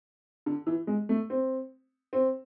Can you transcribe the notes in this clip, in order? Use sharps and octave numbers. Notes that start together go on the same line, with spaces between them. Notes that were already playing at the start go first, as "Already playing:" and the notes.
D3
E3
G#3
A3
C4
C4